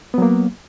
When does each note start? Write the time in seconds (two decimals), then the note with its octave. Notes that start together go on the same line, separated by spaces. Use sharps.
0.14 B3
0.18 F#3
0.22 A#3